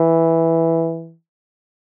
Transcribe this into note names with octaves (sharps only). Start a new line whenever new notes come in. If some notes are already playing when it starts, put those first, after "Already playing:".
Already playing: E3